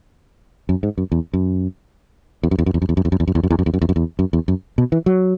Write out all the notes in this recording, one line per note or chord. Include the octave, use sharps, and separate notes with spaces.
F#2
G#2
F#2
E2
F#2
E2
F#2
E2
F#2
E2
F#2
E2
F#2
E2
F#2
E2
F#2
E2
F#2
E2
F#2
E2
F#2
E2
F#2
E2
F#2
E2
F#2
B2
E3
F#3